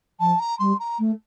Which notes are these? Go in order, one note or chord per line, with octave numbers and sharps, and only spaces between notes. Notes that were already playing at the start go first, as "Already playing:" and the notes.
F3 A5
A#5
G3 C6
A#5
A3